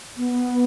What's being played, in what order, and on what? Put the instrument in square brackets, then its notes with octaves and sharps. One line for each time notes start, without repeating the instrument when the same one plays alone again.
[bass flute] B3